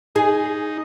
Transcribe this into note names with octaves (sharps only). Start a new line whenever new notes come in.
D#4 G#4